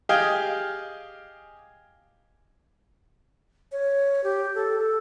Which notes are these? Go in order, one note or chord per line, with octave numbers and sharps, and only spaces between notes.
G4 G#4 D#5 F5 G5 G#5
C#5
G4
A4
A4